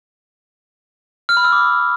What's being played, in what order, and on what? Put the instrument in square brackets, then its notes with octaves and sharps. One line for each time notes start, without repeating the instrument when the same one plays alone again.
[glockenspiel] F6
B5
E6
D6